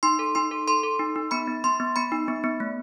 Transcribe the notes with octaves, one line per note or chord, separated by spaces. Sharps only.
D#4 C6
A4
D#4 C6
A4
A4 C6
A4
D#4
D#4
B3 B5
B3
B3 C6
B3
B3 B5
D#4
B3
B3
A3